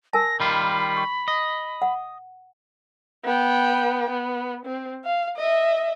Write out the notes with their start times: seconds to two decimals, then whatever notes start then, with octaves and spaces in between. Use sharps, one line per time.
0.13 A#4 G#5 A5 A#6
0.40 D#3 G3 F4 B5
0.97 C#6
1.28 D#5
1.82 F#5
3.25 B3 G5
4.10 B3
4.65 C4
5.04 F5
5.36 D#5 E5